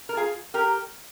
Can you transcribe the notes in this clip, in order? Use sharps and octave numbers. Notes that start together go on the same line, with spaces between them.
A#4
F4 G#4
G4 A#4